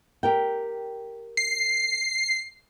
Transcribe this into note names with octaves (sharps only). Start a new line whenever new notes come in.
G4 A#4 G5
C7